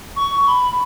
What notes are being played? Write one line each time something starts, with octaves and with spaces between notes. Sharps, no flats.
C#6
B5